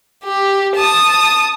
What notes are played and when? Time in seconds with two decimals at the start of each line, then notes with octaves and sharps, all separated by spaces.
0.24 G4
0.75 A5 D#6